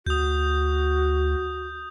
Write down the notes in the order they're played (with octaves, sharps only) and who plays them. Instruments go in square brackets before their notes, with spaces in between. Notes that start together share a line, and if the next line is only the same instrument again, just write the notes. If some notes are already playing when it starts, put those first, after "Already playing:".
[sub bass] D2 [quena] F#4 [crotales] D#6 G6